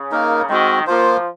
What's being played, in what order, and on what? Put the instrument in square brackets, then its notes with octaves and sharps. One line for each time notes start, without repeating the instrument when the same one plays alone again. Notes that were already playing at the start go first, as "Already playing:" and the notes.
Already playing: [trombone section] C#3
[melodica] A#3 D#4 A#4
[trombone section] D#3 [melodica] G#3 C4 F#4
[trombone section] F3 [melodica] A#3 F4 C5